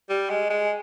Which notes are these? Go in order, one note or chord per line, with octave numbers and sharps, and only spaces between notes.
G3
G#3
G#3